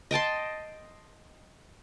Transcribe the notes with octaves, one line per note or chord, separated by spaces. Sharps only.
D#5 G5 A5 C6